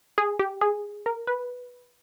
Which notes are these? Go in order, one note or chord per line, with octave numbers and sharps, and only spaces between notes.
G#4
G4
G#4
A#4
B4